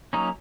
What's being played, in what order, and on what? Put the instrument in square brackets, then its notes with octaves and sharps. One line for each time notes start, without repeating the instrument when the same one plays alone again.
[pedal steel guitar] F#3 A#3 C#4 D#4